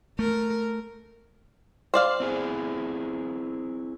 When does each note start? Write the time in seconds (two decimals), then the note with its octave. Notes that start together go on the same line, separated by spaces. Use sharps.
0.19 A3 A#4
1.94 C5 D5 F5
2.20 C4 E4 G#4